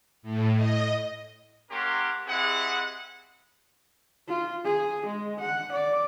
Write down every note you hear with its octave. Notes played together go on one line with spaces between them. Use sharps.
A2
D#5
A#3 C#4 G4 A#4 F#5 C6
C4 E4 G4 G#4 D#5 F#5
F4
G#4
G#3
F#5
D5